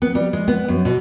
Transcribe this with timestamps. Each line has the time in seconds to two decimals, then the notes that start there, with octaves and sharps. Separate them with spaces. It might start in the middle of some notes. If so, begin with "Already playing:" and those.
0.02 B3
0.15 G3
0.33 G#3
0.48 B3
0.68 F#2
0.85 B2